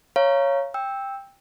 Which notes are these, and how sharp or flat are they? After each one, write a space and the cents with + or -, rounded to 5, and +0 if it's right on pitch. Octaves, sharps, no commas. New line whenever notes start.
C#5 +0 F5 -20 A#5 +0
G5 +15 E6 -10